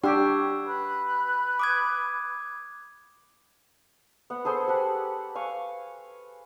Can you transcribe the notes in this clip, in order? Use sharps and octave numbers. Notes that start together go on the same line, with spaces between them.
D4 G4 C#5 F#5 E6
B4
D6 D#6 G#6
B3 F#5
G#4 A4 C5 C6
G4 B4 F#5 A5
F5 G#5 C#6